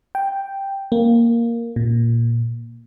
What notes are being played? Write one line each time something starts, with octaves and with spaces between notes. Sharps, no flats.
G5
A#3
A#2